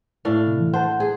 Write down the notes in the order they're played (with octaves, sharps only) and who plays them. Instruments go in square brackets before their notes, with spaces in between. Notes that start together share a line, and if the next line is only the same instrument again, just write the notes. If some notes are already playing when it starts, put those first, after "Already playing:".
[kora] A2 D4 F5
[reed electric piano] C3
E3
[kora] C5 [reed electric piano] F#5 A5
[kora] G#4